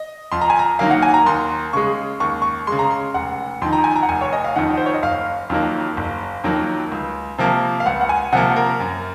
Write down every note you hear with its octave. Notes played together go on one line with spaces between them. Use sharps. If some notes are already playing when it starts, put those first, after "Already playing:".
Already playing: D#5
F2 C6
A#5
G#5
A#5
D#3 F#3 A#3 F5
F#5
G#5
A#5
D#2 C6
C#3 G#3 C#6
D#2 C#6
C#6
C#3 G#3 C6
A#5
C6
F1 F#5
F2 D#3 C6
A#5
G#5
A#5
F#5
F1 G#5
C#5
D#5
F5
F2 D#3 F#5
C5
C#5
D#5
F#1 F5
F2 D#3 F#3 A#3
F#1
F2 D#3 F#3 A#3
C#2
C3 F3 A#3
F5
C#2 F#5
F#5
G#5
C3 F3 A#3 F#5
A#4
F#2